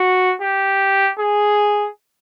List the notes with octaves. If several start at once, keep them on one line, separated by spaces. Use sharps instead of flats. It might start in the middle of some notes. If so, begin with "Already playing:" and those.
Already playing: F#4
G4
G#4